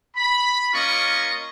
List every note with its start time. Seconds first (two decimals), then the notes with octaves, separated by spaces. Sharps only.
0.17 B5
0.73 A#3 C#4 F4 A#4 D#5 C#6